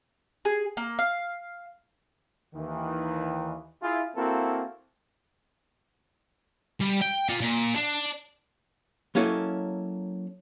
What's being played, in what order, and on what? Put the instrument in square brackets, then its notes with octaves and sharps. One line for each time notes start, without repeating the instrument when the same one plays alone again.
[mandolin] G#4
A#3
F5
[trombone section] D#2 D#3 E3
E4 F4 G#4
A#3 C4 E4 F#4 A4 A#4
[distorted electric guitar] G3
G5
F4 D5
A#2
D4
[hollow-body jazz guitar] F#3 A#3 C#4 E4 A4 D#5